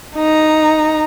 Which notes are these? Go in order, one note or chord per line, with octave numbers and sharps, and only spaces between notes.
D#4 A#5